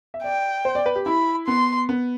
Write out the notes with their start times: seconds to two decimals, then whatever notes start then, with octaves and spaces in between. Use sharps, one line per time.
0.14 E5
0.23 D5 G5
0.65 C5
0.75 D5
0.86 B4
0.96 G4
1.06 E4 B5
1.47 B3 C6
1.89 B3